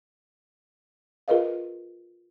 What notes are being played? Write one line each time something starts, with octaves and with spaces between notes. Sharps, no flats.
F4 G#4 A#4 B4 D#5 F5